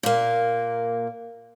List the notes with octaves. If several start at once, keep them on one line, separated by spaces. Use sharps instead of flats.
A#2 A#3